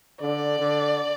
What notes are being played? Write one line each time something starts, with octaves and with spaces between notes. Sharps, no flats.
D3 D5
D3